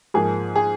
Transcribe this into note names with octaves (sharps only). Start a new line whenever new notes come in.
G#2 F3 A#3 G#4
G#4